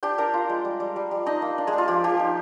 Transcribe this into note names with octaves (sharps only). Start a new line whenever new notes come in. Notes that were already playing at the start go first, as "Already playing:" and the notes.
D4 G4 G5
D4 A#4 A#5
F4
G#3
G3
G3
G3
G3
D4 D#4 D#5
A#3
D4
G#3 G#4
D4
F4
F3 G4
F3 G4
D#4